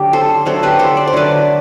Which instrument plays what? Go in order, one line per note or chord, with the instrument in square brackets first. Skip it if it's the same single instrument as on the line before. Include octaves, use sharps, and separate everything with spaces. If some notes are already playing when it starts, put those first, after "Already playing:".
Already playing: [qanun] D3 F#3 A3 G4
A4 C5
D3 F#3 A3 A4 C5
G4 B4
A4 C5
D5
C5
D3 F#3 A3 B4 D5